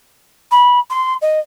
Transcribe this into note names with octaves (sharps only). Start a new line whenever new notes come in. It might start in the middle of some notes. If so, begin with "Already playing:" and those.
B5
C6
D#5